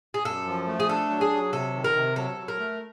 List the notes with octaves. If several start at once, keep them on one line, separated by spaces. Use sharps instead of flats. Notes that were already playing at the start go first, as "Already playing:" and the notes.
G#4
F#2 A4
F3
A3
G#4
D4 A4
F#3
G#4
F#3
C3 A4
D#3
A#4
C3
F#3 A4
F#3
A#4
A3